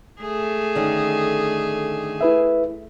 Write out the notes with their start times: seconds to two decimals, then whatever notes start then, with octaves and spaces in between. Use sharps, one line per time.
0.21 A3 G#4
0.76 D3 D#3 C#4
2.21 E4 B4 E5